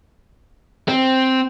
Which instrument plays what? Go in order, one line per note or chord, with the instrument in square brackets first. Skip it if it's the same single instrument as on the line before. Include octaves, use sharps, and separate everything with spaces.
[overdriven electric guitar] C4